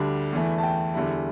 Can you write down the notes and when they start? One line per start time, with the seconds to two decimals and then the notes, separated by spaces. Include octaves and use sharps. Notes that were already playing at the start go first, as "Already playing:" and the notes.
Already playing: D2 D3 G3 D4
0.33 E2 E3 A3
0.58 A5
0.63 G5
0.94 E2 D3 G3 E4